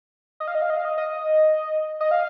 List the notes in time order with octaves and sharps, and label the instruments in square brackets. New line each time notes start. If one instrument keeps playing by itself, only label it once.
[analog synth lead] D#5
F5
D#5
F5
D#5
F5
D#5
D#5
D#5
F5